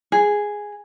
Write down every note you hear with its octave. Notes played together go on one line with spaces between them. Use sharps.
G#4